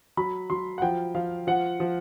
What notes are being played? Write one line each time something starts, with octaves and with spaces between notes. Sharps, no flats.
F#3 B5
F#3 C6
F#5
F3 G5
F3 F5
F3 F#5
F3